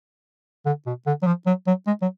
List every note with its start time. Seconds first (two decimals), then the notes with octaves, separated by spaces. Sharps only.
0.66 D3
0.87 B2
1.07 D3
1.23 F#3
1.27 F3
1.47 F#3
1.67 F#3
1.87 G#3
2.02 F#3